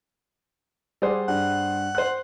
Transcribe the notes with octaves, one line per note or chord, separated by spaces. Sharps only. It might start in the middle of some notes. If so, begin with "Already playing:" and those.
G3 G#4 C5 D5 F#5
G2 F#5
C5 F#6